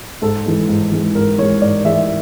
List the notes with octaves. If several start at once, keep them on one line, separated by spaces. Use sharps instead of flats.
G#2 A4
E3 G#3
G#2
E3 G#3
G#2 A#4
E3 G#3 C#5
G#2 D5
E3 G#3 E5